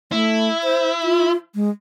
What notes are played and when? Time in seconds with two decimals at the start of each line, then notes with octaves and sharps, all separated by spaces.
0.12 A3 E4
0.64 C5
1.03 F4
1.55 G#3